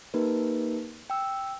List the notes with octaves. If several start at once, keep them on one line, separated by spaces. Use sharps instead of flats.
A#3 D#4 G4 A#4 B4
G5 E6